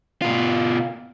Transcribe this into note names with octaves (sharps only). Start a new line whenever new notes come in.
B2 F4